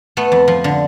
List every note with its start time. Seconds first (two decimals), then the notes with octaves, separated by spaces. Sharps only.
0.17 A3 B3
0.32 F2
0.48 F3
0.64 D3